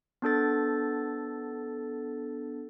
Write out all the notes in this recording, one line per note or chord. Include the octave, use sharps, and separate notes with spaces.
B3 D4 A4 A6